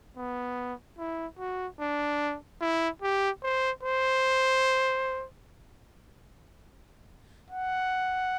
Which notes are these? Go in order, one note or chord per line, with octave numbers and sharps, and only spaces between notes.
B3
E4
F#4
D4
E4
G4
C5
C5
F#5